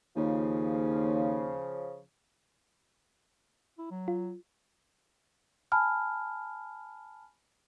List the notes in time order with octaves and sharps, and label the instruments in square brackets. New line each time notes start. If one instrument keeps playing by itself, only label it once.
[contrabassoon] D#2 [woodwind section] C#3 F3
[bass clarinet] E4
F#3
[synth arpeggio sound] F4
[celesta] G#5 A5 B5 F6